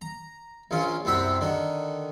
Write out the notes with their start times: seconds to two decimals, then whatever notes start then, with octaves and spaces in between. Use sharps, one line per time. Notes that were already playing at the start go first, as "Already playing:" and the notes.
0.01 A#5
0.71 A#1 A#2 C#4 F4
1.05 C2 F#2 C4 E5 F#5
1.41 D3 D#3 F#4